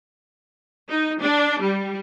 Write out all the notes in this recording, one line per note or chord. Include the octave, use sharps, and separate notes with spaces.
D#4
D4
G3